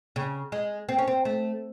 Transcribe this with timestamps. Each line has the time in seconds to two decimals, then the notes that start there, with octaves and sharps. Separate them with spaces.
0.16 C#3
0.52 G#3
0.89 C4
0.99 C#4
1.08 C4
1.25 A3